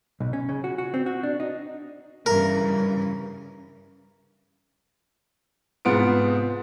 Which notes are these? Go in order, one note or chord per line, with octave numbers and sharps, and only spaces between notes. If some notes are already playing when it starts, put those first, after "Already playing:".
B1
C#4
C#3
F#4
F#4
C4
F#4
D4
D#4
G2 C#3 E3 A#4
G#2 C3 B3 F4 B4 D7